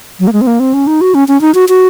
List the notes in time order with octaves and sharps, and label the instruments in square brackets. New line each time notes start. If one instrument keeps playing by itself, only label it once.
[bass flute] F#3
A#3
G#3
C4
A#3
C4
C#4
D#4
F#4
C#4
C#4
D#4
F#4
F#4